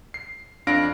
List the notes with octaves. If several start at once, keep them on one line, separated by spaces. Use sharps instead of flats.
C7
F2 D4 F5 A#6 D7